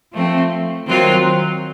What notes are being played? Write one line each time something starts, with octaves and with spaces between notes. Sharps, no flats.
F3 A3 C4
D#3 F#3 C4 F4